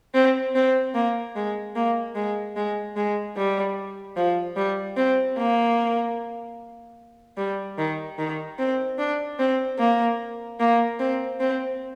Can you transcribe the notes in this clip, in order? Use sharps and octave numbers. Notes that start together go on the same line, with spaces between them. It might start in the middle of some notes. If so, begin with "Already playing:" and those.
C4
C4
A#3
G#3
A#3
G#3
G#3
G#3
G3
F3
G3
C4
A#3
G3
D#3
D#3
C4
D4
C4
A#3
A#3
C4
C4